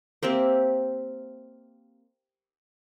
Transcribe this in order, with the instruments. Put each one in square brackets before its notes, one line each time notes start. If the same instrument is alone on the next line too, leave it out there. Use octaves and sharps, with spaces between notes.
[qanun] A#3 C4 G4 E5